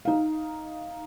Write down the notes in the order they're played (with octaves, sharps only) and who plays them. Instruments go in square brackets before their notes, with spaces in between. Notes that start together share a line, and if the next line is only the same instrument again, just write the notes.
[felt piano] D#4 F5